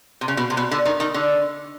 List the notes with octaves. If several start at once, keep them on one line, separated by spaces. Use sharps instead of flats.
C3
C#3
B2
C3
B2
D3
D#3
D#3
D3